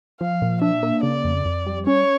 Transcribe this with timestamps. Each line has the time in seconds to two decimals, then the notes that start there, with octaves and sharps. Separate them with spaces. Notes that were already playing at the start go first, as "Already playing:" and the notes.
0.21 F3 F5
0.42 A#2
0.62 D4 E5
0.83 A#3
1.03 C#3 D5
1.24 F2
1.45 F2
1.66 G3
1.86 C#4 C#5